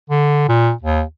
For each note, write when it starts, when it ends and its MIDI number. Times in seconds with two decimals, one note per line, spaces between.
0.10 0.49 50
0.49 0.72 46
0.82 1.02 39